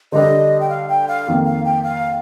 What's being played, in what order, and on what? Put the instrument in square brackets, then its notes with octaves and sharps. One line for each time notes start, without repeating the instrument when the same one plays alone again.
[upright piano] D3 G3 D4 A4 [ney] D#5
[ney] G5
F5
G5
F5
[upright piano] F2 D#3 A#3
[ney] F5
G5
F5